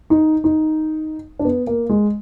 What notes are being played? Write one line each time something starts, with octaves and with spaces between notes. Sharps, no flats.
D#4
D#4
D4
B3
A#3
G#3